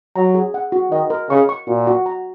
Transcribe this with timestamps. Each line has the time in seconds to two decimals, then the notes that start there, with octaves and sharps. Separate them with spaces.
0.16 F#3 A#5
0.34 G#4
0.54 F#5
0.72 F#4
0.91 D#3 D#5
1.10 A#4
1.30 C#3 C#6
1.49 C#6
1.67 A#2 F#4
1.87 F#4
2.06 A#5